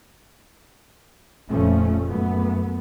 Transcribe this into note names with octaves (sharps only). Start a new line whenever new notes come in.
F1 F2 A#2 F3 A3 C#4
F#2 A3 B3